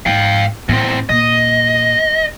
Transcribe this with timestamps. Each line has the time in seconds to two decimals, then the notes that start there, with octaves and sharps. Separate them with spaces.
0.06 G#2 F5 G5
0.69 E2 A2 C4
1.09 A#2 D#5